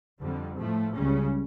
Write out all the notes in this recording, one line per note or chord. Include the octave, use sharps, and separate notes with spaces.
F2 D3 G3
A2 F3 A3
C#2 C#3 G3 C#4